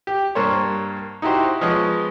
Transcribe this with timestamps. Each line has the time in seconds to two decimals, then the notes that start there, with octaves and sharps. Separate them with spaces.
0.07 G4
0.35 G2 A#3 C5 C#5
1.22 D#4 E4 F#4 G4 C5
1.61 F3 G#3 B3 C#5 D#5